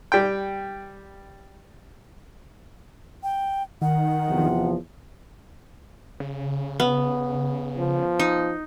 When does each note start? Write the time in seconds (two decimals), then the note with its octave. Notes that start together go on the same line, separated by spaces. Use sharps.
0.12 G3 G5
3.23 G5
3.82 D#3 F#5
4.29 E2 C3 F3
6.20 C#3
6.80 B3
7.78 F3
8.20 D#4